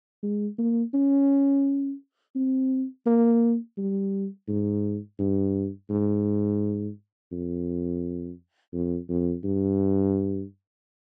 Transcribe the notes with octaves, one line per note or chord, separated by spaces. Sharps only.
G#3
A#3
C#4
C4
A#3
G3
G#2
G2
G#2
F2
F2
F2
G2